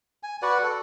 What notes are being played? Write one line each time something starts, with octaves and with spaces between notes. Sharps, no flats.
G#5
F#4 B4 D5 F#5
A4